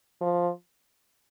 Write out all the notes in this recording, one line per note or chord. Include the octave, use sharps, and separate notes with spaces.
F3